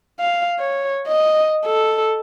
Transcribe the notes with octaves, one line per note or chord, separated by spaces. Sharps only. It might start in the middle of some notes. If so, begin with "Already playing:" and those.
F5
C#5
D#5
A4